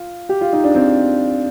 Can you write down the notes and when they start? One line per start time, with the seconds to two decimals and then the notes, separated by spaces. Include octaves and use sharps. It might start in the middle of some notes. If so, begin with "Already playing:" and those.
Already playing: F4
0.29 G4
0.41 F4
0.53 D#4
0.64 D4
0.75 C4